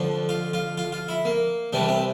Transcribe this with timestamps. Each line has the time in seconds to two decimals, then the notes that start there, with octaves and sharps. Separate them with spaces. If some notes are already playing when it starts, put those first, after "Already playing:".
Already playing: F2 D3 F3
0.29 F4
0.53 F4
0.77 F4
0.92 F4
1.09 E4
1.25 A#3
1.73 C2 C3 E3 G3 D4
1.89 C4